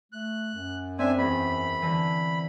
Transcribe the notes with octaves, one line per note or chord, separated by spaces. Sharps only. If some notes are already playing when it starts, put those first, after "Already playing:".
A3 F#6
F#2
C4 D4 E5 G#5
E2 B5
D3 E3